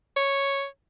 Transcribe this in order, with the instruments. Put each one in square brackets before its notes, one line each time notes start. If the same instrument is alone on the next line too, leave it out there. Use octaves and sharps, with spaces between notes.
[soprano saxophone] C#5